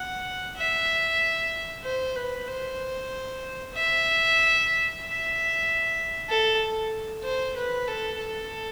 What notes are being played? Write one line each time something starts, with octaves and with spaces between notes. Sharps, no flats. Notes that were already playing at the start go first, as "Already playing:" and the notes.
Already playing: F#5
E5
C5
B4
C5
E5
E5
A4
C5
B4
A4
A4